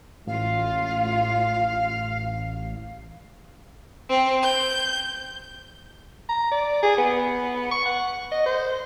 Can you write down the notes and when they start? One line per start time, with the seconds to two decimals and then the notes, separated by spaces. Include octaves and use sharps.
0.27 A1 A2 F4 F5
4.09 C4
4.43 G6
6.29 A#5
6.52 D5
6.83 G#4
6.98 B3
7.71 C#6
7.86 F#5
8.32 D#5
8.46 C5